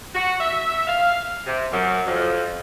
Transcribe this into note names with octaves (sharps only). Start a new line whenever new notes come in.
F#4
E5
F5
C3
F#2
F2